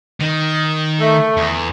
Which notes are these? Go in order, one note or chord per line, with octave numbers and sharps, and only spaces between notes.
D#3
A3
E2